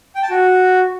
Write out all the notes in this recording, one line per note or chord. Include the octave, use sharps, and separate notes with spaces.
G5
A5
F#4